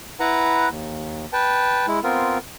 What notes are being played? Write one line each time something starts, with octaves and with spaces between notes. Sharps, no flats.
E4 B4 F#5 A#5
D#2
B4 G5 A5
G#3 E4
B3 C4 F4 A#4